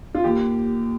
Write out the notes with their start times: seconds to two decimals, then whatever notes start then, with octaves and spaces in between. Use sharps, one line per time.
0.15 F4
0.24 D#2 G4